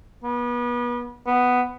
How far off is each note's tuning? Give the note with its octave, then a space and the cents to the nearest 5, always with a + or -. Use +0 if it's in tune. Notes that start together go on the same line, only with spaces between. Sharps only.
B3 -30
B3 +5